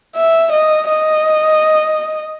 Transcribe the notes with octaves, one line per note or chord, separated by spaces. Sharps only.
E5
D#5
D#5